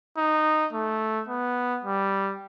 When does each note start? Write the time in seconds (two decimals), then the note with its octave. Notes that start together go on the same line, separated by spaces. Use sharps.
0.17 D#4
0.73 A3
1.28 B3
1.84 G3